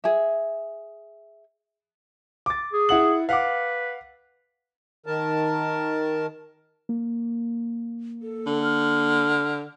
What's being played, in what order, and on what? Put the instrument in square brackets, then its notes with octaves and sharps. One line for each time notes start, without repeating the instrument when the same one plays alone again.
[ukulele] G#4 E5
[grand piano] D6 A6
[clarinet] G#4
[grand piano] E4 F#5 F#7
[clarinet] B4 [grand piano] F5 F#5 D6
[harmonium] D#3 A#4 A5
[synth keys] A#3
[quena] A4
[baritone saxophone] D3
[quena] F6